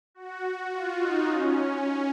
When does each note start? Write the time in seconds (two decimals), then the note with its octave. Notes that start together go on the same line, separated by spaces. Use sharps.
0.15 F#4
0.71 F4
0.99 D#4
1.28 C#4